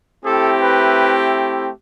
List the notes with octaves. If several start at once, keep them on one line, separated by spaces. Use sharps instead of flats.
A3 C4 E4 G4 A4
B4